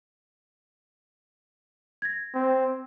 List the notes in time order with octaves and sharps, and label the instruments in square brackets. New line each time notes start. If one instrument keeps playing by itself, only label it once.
[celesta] G#6 A#6
[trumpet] C4